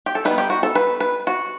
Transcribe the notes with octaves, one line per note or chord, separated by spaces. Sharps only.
G4
A4
G3 B3 D#4 B4
G4
F#4
A4
B4
B4
F#4